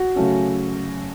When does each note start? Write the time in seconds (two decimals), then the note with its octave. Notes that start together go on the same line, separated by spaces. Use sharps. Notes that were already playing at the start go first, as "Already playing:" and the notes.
Already playing: F#4
0.16 C#3 F#3 A3 C#4